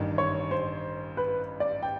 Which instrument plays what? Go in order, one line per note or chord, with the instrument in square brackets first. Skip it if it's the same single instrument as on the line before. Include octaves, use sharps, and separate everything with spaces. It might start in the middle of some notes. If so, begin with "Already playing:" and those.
Already playing: [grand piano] A1 G2 D#3
[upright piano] C#5
C5
B4
D5
G5